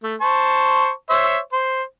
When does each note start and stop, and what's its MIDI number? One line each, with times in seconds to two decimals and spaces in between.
0.03 0.16 57
0.21 0.90 72
0.21 0.90 81
0.21 0.90 85
1.10 1.39 72
1.10 1.39 73
1.10 1.39 76
1.53 1.82 72